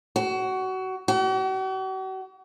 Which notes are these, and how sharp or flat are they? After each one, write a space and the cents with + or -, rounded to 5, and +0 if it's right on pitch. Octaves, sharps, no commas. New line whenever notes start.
F#4 +25
F#4 +45